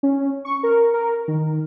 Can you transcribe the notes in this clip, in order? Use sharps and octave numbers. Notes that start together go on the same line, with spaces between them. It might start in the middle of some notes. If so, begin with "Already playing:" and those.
C#4
C#6
A#4
A#4
D#3